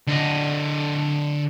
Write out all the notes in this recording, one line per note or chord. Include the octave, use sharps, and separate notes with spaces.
D3 D#5